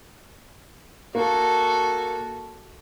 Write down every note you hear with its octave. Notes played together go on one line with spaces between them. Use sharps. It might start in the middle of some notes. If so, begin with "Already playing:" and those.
A#3 F#4 A4